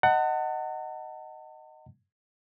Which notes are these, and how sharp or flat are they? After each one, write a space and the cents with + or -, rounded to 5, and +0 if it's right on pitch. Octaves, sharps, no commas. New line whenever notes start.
D#5 +0 F#5 +15 A5 +40